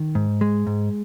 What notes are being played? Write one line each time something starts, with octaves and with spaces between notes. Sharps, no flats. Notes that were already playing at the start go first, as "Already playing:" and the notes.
Already playing: D#3
G#2
G#3
G#2